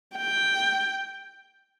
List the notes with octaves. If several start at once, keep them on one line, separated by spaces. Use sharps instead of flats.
G5